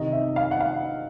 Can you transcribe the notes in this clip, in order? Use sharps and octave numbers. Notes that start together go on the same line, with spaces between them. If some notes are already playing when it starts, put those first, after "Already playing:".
Already playing: C3 D#3 D#5
E5
F5
F#5
F5